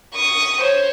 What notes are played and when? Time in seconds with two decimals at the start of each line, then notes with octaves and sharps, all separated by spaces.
0.15 C#6 D#6
0.61 C5 C#5